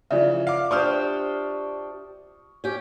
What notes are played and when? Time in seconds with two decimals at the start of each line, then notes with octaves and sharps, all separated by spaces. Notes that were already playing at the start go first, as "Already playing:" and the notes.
0.11 C#3 E3 F3 F4 D5 E5
0.47 F5 D6
0.71 D4 G4 C5 C#6 D#6 F6
2.64 C#4 G4